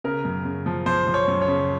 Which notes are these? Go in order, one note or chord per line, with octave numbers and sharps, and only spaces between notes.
C#3 A#4
F#2
C#3
F3
F3 C5
F3
C#5
F#2
C#5
C#3